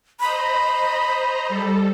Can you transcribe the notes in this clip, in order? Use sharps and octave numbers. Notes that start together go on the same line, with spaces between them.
C5 D#5 A#5 B5
G3 A4